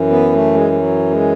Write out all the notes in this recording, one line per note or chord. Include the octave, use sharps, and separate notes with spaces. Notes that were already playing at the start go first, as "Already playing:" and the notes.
Already playing: F#2 E3
B3
A3
G#3
G#3
F#3
G#3